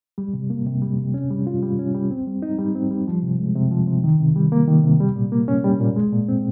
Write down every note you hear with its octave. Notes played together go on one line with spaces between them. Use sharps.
G3
C3
A#3
C3
G3
C3
C#4
G3
F4
G3
C#4
G3
C4
G3
D#4
G3
C4
G3
F3
C3
G#3
C3
F3
C3
D#3
C3
G3
A#3
D#3
C3
G3
A#2
A#3
C#4
G3
A#2
G#3
A#2
C4